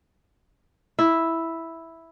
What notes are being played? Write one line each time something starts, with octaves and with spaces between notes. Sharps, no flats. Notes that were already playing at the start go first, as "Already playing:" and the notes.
E4